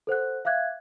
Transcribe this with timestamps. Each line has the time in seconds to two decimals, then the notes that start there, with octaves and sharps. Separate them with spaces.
0.07 A4 C5 F#5 F#6
0.45 E5 F5 D6 F#6 G#6